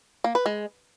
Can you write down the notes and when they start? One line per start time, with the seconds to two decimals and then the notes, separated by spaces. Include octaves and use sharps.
0.24 A#3
0.35 B4
0.46 G#3